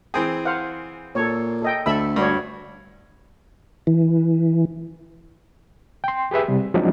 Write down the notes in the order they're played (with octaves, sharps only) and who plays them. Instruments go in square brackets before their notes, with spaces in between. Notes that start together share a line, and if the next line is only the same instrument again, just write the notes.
[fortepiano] E3 C4 G#4 [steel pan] G5
[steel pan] C5 F5 F#5
[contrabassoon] A#2 [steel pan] A4 C#5
[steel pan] A4 D#5 G5
[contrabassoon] D2 [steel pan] A4 E5 B5 [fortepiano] E6
[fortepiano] G2 [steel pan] D4 F#4 C#5
[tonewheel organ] E3
[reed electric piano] G5 C6
G4 G#4 B4 E5
C3 G3
F3 F#3 G#3 C4 D4 D#4